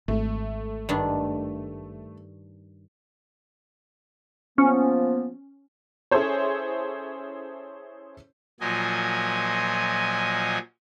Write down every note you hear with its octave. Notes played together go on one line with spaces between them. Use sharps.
G#1 A3
G2 D#3 D4
F3 A#3 B3 C#4
C#4 E4 G#4 A4 C5 C#5
A#2 F3 F#3 D#5 G#5